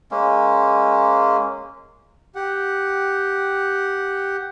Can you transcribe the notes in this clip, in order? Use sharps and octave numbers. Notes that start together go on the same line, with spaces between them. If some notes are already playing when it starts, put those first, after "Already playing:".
G#3 A#3 C#4
G4 F#5